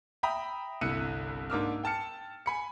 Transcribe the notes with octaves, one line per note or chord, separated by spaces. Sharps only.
E5 G5 A#5 B5 D#6
G1 C2 E4 F#6 C#7 D#7
G#2 A#3 D4 D6 E6 F6
G5 A5 F6 C#7
G#5 B5 C#7